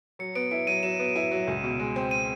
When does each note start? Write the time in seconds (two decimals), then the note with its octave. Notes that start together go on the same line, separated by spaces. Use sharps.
0.19 F#3 C#7
0.35 B3 D7
0.51 E4 D7
0.67 F#3 D#7
0.83 F#3 E7
0.99 B3
1.16 E4
1.31 F#3
1.47 C#2
1.64 B2
1.79 G#3
1.96 C4
2.11 D#7